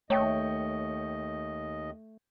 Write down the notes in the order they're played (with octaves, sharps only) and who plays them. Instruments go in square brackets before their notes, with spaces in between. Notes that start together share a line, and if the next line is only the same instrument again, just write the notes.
[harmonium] D#2 D#5 [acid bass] A3 [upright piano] C#5 G5